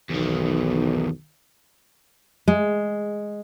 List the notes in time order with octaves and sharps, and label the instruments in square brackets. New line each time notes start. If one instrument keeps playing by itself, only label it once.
[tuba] B1 [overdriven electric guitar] E2 D#3
[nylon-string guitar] G#3